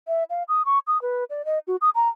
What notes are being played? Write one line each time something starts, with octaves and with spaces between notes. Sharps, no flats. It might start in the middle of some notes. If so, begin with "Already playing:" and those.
E5
F5
D#6
C#6
D#6
B4
D5
D#5
F#4
D#6
A#5